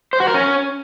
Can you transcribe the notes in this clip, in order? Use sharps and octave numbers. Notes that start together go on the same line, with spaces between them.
C5
F#4
A#4
C#4